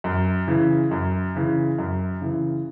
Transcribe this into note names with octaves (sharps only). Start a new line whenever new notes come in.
F#2
C#3 E3
F#2
C#3 E3
F#2
C#3 E3